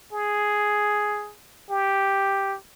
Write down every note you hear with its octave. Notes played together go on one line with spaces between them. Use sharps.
G#4
G4